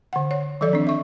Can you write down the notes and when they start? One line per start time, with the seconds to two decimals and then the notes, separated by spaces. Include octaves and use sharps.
0.13 D3 F#5
0.31 C#5
0.61 D#3 F3 F#3 A4 D5
0.73 C4 D4
0.87 E5 C#6